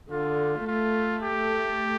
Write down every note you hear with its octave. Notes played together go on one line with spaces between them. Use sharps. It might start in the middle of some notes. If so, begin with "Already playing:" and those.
D3 F4
A3 F4
G4